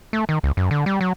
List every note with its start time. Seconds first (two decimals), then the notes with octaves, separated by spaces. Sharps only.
0.13 A3
0.29 D#3
0.44 C#2
0.57 F#2
0.71 D3
0.86 G3
1.01 F#3